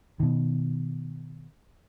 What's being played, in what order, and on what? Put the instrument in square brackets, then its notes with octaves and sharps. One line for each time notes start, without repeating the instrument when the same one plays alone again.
[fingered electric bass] B2 D#3